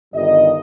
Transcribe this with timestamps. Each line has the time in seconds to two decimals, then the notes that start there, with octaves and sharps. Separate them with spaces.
0.14 G1 G2 D#3 G3 D#5